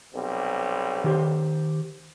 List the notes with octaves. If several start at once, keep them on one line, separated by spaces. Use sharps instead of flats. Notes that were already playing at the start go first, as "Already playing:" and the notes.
B1 C3 G3
D#3 G4 C5